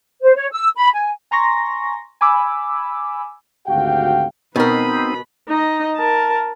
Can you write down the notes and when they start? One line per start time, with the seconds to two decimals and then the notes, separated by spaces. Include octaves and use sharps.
0.22 C5
0.35 C#5
0.51 E6
0.76 B5
0.93 G#5
1.31 G#5 A#5 C6 C#6 A#6
2.21 G#5 B5 D6 E6
3.67 G#1 D2 F#4 G4 F5 G5
4.56 B2 B3 C4 D#4 A#4 B4 B5
5.49 D#4 D#5
5.97 A#4 A5